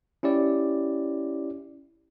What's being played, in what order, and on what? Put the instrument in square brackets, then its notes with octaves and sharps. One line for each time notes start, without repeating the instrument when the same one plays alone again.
[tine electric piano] C#4 E4 G4 D5